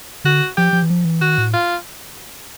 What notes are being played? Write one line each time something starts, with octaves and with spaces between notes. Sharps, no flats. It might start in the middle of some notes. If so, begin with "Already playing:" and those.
D3 F#4
F3 G4
F3
E3
F3
E3
D#3 F#4
A2
F4